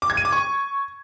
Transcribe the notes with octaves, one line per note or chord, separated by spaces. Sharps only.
D6
G#6
D#7
D6
C#6